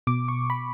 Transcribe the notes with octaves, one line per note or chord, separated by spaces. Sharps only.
B2 D6
C#6
B5